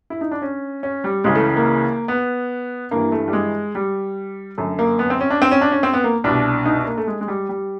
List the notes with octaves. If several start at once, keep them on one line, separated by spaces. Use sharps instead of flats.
E4
D#4
D4
C#4
C#4
G3
C#2 C#3 E3 G#3
A3
A#3
B3
G2 E3 A#3
A3
G3
G#3
G3
F#2 D3 A3
A#3
B3
C4
C#4
D4
C4
C#4
D4
C#4
C4
B3
A#3
C2 B2 D4
D#4
D4
A#3
A3
G#3
G#3
G3
G3